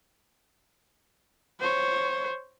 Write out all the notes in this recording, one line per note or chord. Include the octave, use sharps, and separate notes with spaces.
C5 C#5